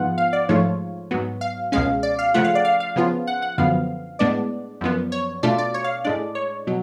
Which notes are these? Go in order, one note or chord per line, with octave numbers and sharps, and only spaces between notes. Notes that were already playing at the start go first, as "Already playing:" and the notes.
Already playing: G#2 F3 B3 F4 F#5
F5
D5
G#2 F3 A3 F4 C#5
G#2 F#3 B3
F5
C#2 B2 G#3 C#4 F5
D5
F5
C#3 F3 A3 F4 F#5
F5
D5
F5
F5
C#3 F3 B3 F4
F#5
F#5
F#2 D3 F3 B3 F5
A2 G#3 B3 D4 D5
F#2 F3 B3
C#5
B2 A3 D4 F4 D5
D5
C#5
F5
A2 G#3 D4 D5
C#5
B2 F#3